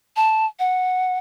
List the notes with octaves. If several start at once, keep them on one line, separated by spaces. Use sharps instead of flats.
A5
F#5